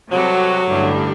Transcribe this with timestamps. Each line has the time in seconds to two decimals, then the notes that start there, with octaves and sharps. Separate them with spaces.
0.11 C3 F#3 G3 C4 F#4 A4
0.69 A1 G2 D3 G3 D4